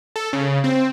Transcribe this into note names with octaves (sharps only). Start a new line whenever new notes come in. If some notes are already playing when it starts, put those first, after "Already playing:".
A4
C#3
C4